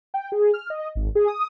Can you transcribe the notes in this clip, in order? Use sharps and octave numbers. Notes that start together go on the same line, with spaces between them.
G5
G#4
F6
D#5
G#1
G#4
D#6